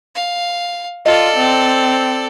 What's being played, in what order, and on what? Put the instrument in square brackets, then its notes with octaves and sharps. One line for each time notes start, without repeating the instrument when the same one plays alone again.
[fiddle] F5
[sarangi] F4 [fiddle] A4 D5 [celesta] D#5
[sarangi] C4